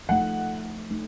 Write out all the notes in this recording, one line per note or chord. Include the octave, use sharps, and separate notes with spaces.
F3 A3 D#4 F#5
A3 D#4